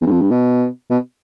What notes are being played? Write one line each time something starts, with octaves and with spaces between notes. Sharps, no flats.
E2
G2
F2
G2
B2
B2